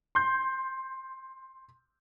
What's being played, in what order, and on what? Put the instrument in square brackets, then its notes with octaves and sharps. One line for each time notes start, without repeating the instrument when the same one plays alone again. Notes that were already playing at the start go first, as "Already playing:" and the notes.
[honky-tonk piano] C6 G6